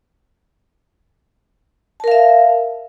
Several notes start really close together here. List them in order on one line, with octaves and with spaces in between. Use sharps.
A5 A#4 F5 E5